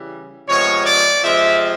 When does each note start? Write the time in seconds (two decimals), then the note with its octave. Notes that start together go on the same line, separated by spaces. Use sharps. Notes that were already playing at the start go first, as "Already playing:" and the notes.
Already playing: C#3 E3 G3
0.47 C3 F3 G#3 B3 C#5
0.85 D5
1.24 C3 F3 G#3 C4 E5